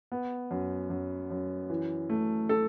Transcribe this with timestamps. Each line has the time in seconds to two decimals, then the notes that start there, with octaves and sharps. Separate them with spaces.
0.12 B3
0.51 F#2
0.90 F#2
1.30 F#2
1.70 E3
2.10 A3
2.49 A4